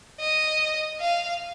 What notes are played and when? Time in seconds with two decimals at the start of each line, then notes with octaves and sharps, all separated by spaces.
0.20 D#5
1.01 F5